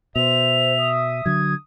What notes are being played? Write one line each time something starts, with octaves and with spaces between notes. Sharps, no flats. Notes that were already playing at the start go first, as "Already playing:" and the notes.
B2 C5 E5 F7
D#6
D3 F#3 G#6